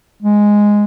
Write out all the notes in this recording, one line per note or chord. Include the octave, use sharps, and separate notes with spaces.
G#3